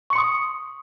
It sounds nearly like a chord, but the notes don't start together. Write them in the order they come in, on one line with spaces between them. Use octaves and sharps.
C#6 C#7 C6 D#6